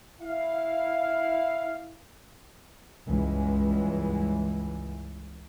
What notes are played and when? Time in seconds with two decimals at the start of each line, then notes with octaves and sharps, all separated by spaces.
0.21 E4 F5
3.08 C#2 G2 E3 G#3